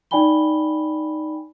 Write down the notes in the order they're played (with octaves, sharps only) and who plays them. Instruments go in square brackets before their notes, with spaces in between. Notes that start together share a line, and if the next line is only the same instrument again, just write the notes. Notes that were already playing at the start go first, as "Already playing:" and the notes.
[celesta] D#4 D5 G5 G#5 B5 G7